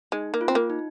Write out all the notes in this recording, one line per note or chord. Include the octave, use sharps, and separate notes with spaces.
G#3 D#4
A#3
F4
C4
A#3
D#4